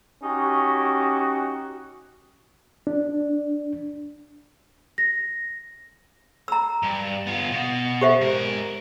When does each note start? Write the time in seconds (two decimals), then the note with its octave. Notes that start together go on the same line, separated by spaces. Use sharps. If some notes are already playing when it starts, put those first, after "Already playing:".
0.23 C#4 D#4 F#4 G4
2.87 D4
4.98 A#6
6.48 A#5 E6
6.83 G2
7.27 B3 F4
7.52 B2
8.01 G4 C5 E5
8.21 G#2 A#4